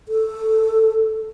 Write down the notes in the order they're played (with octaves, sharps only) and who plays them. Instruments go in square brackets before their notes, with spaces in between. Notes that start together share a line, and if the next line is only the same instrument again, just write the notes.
[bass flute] A4